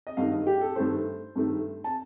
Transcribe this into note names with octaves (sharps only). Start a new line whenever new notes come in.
D#5
G2 D#3 A3 F5
D#5
G4
A4
G2 D#3 A3 C5
G2 D#3 A3
A5